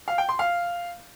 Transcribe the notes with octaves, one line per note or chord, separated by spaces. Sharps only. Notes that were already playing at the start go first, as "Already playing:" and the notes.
F5
G5
C6
F5